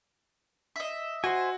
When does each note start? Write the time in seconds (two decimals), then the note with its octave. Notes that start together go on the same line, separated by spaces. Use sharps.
0.76 D#5 E5
1.24 F#4 C5 G#5